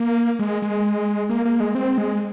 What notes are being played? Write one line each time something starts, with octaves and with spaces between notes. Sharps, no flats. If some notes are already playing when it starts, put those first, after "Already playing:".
Already playing: A#3
G#3
G#3
A#3
A#3
G#3
C4
G#3